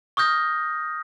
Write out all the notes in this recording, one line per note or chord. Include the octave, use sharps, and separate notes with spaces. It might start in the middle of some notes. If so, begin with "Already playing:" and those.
C#6 D#6 F6 G6 A#6